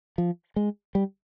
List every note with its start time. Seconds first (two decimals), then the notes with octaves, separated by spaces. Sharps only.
0.18 F3
0.56 G#3
0.95 G3